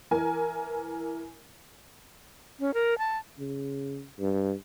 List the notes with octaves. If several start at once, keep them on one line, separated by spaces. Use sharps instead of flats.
E3 A#4 G#5
C#4
A#4
A5
C#3
G2